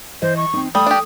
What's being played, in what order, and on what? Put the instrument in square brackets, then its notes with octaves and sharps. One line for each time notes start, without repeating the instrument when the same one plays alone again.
[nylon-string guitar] E3 D#5 [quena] C5
[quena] C#6
[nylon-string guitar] C4 D#4
[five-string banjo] G3 [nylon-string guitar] A3 [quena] D#6
[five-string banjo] D4 G4